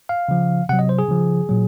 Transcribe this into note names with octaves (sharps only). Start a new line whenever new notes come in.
F5
C#3 F3
C3 F#3 F#5
D#5
C5
G#4
C#3 F3
A#2 F#3